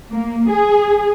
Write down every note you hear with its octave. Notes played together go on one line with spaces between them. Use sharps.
A#3
G#4